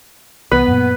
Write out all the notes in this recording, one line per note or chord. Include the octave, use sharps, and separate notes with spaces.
C2 E3 B3 B4
F#2 A#2